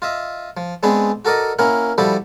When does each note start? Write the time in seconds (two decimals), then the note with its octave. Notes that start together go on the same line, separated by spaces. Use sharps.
0.02 F4 D#5 E5
0.57 F3
0.83 G#3 B3 C4 D4 G#4 B4
1.25 F#4 A4 A#4 D5 D#5
1.59 A#3 C#4 E4 A#4 F#5
1.98 F3 G3 E4 F#4 G4 A4